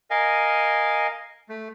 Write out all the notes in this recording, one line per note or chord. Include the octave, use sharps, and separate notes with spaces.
A#4 D#5 F5 G#5
A3